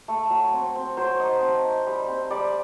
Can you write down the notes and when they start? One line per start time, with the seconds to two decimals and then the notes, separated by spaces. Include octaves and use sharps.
0.08 A3
0.30 F#3
0.53 C4
0.75 C4
0.97 F#3 C5
1.19 D#4
1.42 C4
1.64 D#4
1.86 G3
2.08 C4
2.31 G3 D5